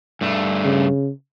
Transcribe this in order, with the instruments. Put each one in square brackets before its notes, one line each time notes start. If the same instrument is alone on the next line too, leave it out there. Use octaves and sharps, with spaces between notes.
[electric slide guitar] G2 A3
[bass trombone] C#3